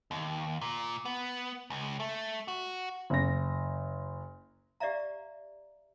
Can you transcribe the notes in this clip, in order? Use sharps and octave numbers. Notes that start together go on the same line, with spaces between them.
D#2
A#2
B3
C#2
A3
F#4
F#1 A#6
G4 D5 E5 F5 A#5